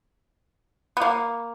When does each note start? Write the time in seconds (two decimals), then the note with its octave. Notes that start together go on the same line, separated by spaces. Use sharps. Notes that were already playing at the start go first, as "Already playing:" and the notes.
0.97 B3
1.02 A#3